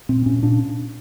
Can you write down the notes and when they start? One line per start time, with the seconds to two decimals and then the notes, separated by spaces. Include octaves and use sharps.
0.09 A#2 C4
0.26 A#2 C#4
0.43 A#2 D4